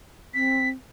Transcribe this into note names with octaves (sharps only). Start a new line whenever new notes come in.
C4 B6